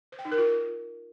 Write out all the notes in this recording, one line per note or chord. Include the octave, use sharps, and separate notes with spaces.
C5
G5
D#4
A#4
F4